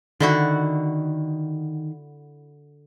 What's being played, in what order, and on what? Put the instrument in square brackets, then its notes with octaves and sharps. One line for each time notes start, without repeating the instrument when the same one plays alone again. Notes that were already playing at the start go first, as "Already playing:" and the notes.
[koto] D3 E4 F#4 [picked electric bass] D#3